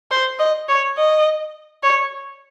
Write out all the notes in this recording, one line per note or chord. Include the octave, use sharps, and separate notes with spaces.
C5
D#5
C#5
D#5
C#5